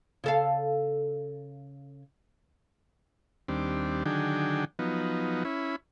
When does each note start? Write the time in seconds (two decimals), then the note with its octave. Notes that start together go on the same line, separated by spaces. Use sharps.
0.24 C#3 A4 F5
3.48 D#2 G3 C4 D4
4.06 D3 D#3 F#3 D4 G#4 G5
4.79 F3 F#3 B3 D#4
5.45 C#4 E4 B5